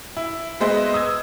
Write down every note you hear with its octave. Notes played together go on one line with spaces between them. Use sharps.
E4
G#3 B3 B4 C5 D#5 E5
D#6 E6 G#6